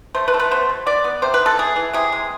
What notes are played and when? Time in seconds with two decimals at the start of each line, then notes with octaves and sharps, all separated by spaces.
0.15 A3 C5
0.28 B4
0.34 A3 A4
0.39 B4
0.51 B3 C5
0.69 B2
0.86 B3 D5
1.04 B3
1.22 C3 C5
1.34 B4
1.40 B3
1.46 A4
1.58 E3 G#4
1.76 E3
1.93 C3 G#4
2.12 G#3